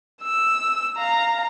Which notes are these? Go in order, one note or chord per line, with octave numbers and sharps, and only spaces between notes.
E6
F5 A#5